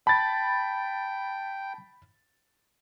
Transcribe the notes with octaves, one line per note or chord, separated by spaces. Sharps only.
G5 A5 B5 A6